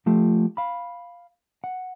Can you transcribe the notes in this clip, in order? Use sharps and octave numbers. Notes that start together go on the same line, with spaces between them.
F3 A3 F4 G4
F5 B5
F#5